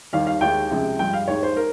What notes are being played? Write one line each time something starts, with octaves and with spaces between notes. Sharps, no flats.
D#2 D#3 G3 F5
F5
D#2 D#3 G#3 G5
C#2 C3 F3 G#3
G2 F3 G#3 G5
F5
D#2 D#3 G#3 C#5
C5
A#4